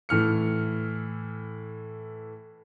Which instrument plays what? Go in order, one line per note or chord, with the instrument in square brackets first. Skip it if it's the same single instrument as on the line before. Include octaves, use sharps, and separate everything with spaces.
[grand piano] A2 E3 F6 C#7